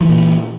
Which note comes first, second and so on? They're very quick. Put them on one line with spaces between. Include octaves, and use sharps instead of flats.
F3 E3 A#2